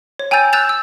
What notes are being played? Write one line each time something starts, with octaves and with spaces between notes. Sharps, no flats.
C#5
G5 G#5 A#5 E6 G6 A6
E6 F#6 G6 A6 E7 F7
E6